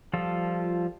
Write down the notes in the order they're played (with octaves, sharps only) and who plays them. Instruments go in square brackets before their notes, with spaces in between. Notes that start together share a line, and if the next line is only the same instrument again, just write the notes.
[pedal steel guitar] F3 G3 F4 A4